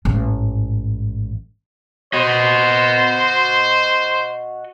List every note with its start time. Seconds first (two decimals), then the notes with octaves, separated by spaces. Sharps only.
0.05 A1 G#2
2.13 F#4 C5 D#5